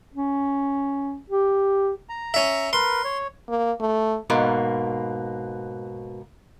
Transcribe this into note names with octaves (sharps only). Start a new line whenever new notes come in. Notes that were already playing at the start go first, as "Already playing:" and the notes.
C#4
G4
A#5
C#4 E5
A#4 B4 C6
C#5
A#3
A3
G#2 B2 A#3